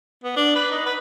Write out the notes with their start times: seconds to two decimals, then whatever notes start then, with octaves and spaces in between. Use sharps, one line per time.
0.24 B3
0.37 D4
0.55 B4
0.71 D#4
0.86 B4